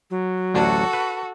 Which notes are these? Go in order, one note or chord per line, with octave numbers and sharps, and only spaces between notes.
F#3
A1 D2 D4 F#4 A4
B4